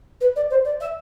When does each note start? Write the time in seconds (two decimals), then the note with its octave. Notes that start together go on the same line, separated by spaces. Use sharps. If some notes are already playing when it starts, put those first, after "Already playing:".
0.20 B4
0.36 D5
0.50 C5
0.64 D5
0.80 E5